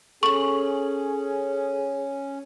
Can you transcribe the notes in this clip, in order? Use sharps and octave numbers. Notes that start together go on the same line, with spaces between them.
C#4 G#4 A4 C#6 F#7